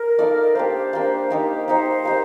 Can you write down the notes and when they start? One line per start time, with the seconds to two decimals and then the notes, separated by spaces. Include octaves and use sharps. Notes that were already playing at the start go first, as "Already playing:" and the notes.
Already playing: A#4
0.19 D#4 A4 D5 F5
0.55 A#3 D4 G4 C5
0.93 A#3 D4 G4
1.30 A#3 D#4 G4 A#4
1.68 A#3 D#4 G4 A#4 C5
2.05 A#3 D#4 G4